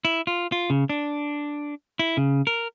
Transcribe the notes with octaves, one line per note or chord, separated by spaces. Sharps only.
E4
F4
F4
C#3
D4
E4
C#3
A#4